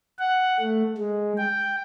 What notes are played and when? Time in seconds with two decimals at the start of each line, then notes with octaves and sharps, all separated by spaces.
0.18 F#5
0.60 A3
0.97 G#3
1.38 G5